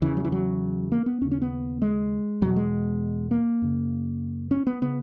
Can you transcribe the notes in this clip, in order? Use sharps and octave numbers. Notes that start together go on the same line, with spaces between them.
E2 C#3 E3
F#3
E3
F#3
A#3
B3
D#2 C#3 C#4
C#4
B3
G#3
E2 B2 F#3
G#3
A#3
F#2 C#3
C#4
B3
C#3 B3